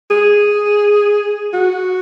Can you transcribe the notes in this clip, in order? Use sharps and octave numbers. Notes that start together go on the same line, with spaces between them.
G#4
F#4